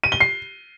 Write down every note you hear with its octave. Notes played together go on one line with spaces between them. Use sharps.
D#7
G7
C7